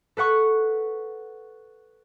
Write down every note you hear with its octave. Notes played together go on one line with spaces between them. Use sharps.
A4 B4 F#5 C#6